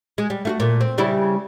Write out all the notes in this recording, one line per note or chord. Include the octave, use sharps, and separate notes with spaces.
G#3
G3
A3 F4 F#4
A#2 A3
C4
C#3 G3 E4